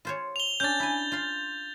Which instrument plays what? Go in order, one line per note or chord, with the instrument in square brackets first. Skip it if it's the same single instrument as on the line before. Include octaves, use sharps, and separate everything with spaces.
[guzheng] F4 C5 C#5
[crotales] F7 G7
[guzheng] C#4 D4 [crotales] G6 A6
[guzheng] E4 G#5
F4 C6